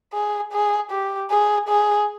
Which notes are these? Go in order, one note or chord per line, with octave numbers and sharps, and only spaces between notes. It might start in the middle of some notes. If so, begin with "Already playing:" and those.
G#4
G#4
G4
G#4
G#4